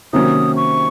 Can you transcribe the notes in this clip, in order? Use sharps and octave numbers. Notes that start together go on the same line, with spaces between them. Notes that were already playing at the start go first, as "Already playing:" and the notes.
C3 D#3 F#3 A#3 C#4 D#6
C#6